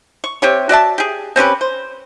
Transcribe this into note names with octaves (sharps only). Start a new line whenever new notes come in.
C#6
C3 G4 C#5
F#4 D5 E5 A5
G4 G#4
C4 C#4 G4 B4
C5